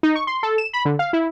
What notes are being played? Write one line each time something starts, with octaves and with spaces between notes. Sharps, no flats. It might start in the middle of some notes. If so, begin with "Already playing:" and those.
D#4
C#6
C6
A4
E7
B5
D3
F5
E4